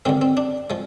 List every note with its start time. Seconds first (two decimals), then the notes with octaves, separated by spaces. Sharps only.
0.05 D#2 D3 G#3 C4
0.21 C4
0.37 D4
0.70 F3 G#3